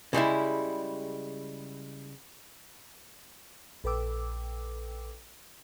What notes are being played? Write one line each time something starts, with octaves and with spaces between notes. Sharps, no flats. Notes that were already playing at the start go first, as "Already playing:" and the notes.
C#3 G3 G#3 E4
A#1 A4 B4 G5 D6 E6